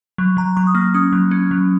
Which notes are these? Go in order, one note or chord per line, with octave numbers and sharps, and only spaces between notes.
F#3
F#3 A#5
F#3 C#6
D#6
A#3 F6
C#4 D#6
F#3
C#4
F#3